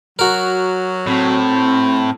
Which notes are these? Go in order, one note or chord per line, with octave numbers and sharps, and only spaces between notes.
F#3 F#4 A#4
A2 C4